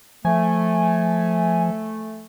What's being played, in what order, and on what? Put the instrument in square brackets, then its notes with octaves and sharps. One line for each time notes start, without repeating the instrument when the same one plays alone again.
[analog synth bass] F3 [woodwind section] A3 [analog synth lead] G#5